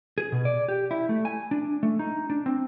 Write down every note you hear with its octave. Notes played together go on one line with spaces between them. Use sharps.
G#4
B2
D5
G4
E4
A3
G#5
D4
A3
D#4
D4
C4